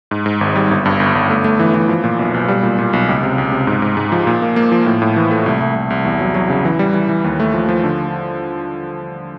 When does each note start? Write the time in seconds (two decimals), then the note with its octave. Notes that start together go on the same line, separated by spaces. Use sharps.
0.11 G#2
0.26 G#2
0.41 G#1
0.55 G3
0.71 G1
0.86 G2
1.00 G1
1.15 G1
1.30 A3
1.44 A3
1.60 E3
1.74 E3
1.89 F3
2.04 A#2
2.19 B1
2.34 B1
2.48 G3
2.63 A#2
2.78 A#2
2.93 B1
3.09 C#2
3.23 C3
3.38 C#2
3.52 C3
3.67 G#2
3.82 G#2
3.97 G#2
4.12 F3
4.27 A#2
4.42 A#3
4.56 A#3
4.72 F3
4.86 A2
5.02 A2
5.16 E3
5.31 A3
5.46 C2
5.61 C2
5.75 C2
5.90 C2
6.05 E2
6.20 F#3
6.35 F#3
6.50 C#3
6.65 E3
6.79 G3
6.94 E3
7.09 E3
7.24 D#2
7.40 A3
7.54 F3
7.69 F3
7.84 D3